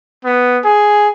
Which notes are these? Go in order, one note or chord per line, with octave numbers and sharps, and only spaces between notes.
B3
G#4